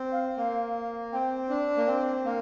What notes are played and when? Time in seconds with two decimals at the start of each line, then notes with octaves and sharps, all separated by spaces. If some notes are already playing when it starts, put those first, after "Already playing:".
Already playing: C4
0.12 F5
0.37 A#3 F5
1.13 C4 G5
1.49 D4
1.77 A#3
1.87 C4 G5
2.24 A#3 F5